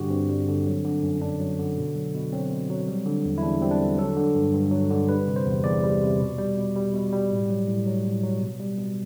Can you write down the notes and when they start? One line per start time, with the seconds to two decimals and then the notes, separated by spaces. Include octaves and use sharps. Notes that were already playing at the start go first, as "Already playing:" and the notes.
Already playing: G2 D3 G3 F#4 G4
0.10 G2 C4
0.29 G3
0.48 D3
0.67 F#3
0.85 D3
1.03 F#2
1.21 F#2 D4
1.40 F#3
1.59 D3
1.77 B2
1.95 F#3
2.14 B2
2.33 F#3 C4
2.51 B2
2.70 F#3
2.88 G3
3.06 D3
3.25 E2
3.38 E4
3.42 E2 D4
3.62 G3 C4
3.71 D4
3.80 D3
3.98 F#3 A4
4.16 D3
4.35 G2
4.54 G2
4.72 F#3
4.90 D3
5.09 G3 B4
5.28 C3
5.36 C5
5.46 E2
5.64 E2 D5
5.83 G3
6.01 C3
6.20 B2
6.38 G3
6.57 B2
6.76 G3
6.93 B2
7.13 G3
7.31 A2
7.50 F#3
7.68 A2
7.86 F#3
8.05 A2
8.23 F#3
8.41 B2
8.60 G3
8.78 B2